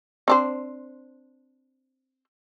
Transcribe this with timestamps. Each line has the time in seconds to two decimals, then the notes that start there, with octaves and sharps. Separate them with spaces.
0.28 C4 D4 C5